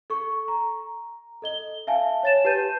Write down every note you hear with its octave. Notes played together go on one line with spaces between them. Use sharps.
A4 C#6
A#5
A4 D#5 G7
E5 F5 G#5 A5
C#5 A6 E7
G4 B4 A5 G6 D#7